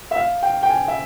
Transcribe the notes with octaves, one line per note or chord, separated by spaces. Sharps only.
E5
F5
G5
G5
G#5
E5